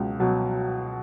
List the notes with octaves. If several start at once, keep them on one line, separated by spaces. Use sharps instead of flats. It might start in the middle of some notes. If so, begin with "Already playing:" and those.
Already playing: C#2 B2 F#3
B2 F#3